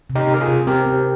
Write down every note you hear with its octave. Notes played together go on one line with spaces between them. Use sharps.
C3
D#4 G4
C3
A#4
F4 G#4
C3
C4 G4 A#4
C4